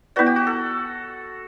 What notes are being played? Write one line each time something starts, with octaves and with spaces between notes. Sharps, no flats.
B3 E4 F#4 B4 D5
G4
F#4
A4